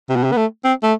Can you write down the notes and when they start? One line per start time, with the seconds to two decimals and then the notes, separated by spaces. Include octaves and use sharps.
0.09 C3
0.16 B2
0.24 C3
0.32 B3
0.37 A3
0.64 C4
0.83 A3